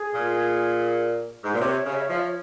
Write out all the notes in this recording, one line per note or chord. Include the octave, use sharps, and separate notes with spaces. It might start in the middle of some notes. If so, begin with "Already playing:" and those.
Already playing: G#4
A#2
G#2
A#2
C3 C#5
C#3 C#5
E5
C#5
F3 E5
C#5